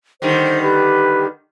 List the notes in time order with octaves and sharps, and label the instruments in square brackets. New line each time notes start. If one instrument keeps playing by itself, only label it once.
[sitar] D3 D#3 G3 [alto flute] C5
[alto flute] G4 [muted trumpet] B4